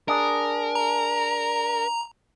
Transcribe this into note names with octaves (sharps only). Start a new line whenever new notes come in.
D4 G#4 A#4
A#5